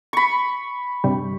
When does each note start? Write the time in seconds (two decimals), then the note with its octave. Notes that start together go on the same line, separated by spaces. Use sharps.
0.13 B5 C#6
1.04 G2 C3 G3